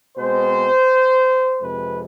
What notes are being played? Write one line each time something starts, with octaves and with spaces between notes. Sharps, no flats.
B2 G#3 C4 C5
F2 C3 G#3 B4